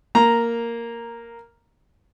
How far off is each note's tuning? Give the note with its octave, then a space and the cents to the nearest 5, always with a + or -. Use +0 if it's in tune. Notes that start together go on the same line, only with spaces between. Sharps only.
A#3 -5 A#5 +0